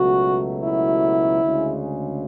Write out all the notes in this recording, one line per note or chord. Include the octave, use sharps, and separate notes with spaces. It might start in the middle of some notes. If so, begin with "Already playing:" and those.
Already playing: C#2 B2 F#3 A3 F#4
E4
D2 C#3 G#3